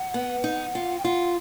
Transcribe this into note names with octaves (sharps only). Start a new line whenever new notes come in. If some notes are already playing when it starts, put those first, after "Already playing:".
Already playing: F#5
B3
D#4
F4
G5
F4 F#5